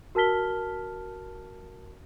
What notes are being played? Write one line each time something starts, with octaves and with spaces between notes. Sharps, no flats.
F#4 A#4 A5 F6 B6 G7